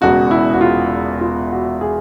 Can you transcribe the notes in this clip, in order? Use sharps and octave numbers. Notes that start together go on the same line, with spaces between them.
E1 E2 C#3 F#4
E4
F#4
F4
F4
F#4
G#4